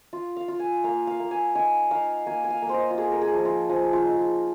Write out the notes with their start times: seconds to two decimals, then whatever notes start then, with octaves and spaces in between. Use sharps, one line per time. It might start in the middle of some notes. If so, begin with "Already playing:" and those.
0.13 F4
0.37 F5
0.48 F4
0.59 G#5
0.84 A#3 F5
1.07 F5
1.20 A#3
1.31 G#5
1.55 D#4 G#5
1.91 D#4 F5
2.26 A#3 G#5
2.44 G#5
2.50 F5
2.62 A#3
2.69 C5 D#5
2.91 F4
2.98 A#3 G#4
3.12 A#4
3.22 G#4
3.34 F3
3.45 F4
3.69 F3 G#4
3.93 F4
4.05 D#4
4.17 G#4